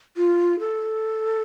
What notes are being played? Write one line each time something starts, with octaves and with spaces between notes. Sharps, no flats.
F4
A4